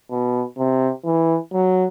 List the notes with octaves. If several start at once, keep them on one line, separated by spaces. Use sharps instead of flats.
B2
C3
E3
F#3